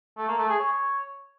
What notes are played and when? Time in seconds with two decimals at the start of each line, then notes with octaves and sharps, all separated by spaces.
0.18 A3
0.28 A#3
0.38 A3
0.49 G#4
0.59 C#5